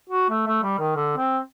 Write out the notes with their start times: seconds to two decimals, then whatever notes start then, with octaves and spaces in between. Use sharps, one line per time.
0.10 F#4
0.30 A3
0.47 A3
0.63 G3
0.79 D#3
0.96 D3
1.17 C4